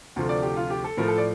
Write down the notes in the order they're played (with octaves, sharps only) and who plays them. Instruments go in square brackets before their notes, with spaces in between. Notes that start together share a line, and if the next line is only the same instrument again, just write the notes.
[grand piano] D2 C3 F3 A3
D5
G4
F4
G4
A4
A2 F3 A3 A#4
A4
D5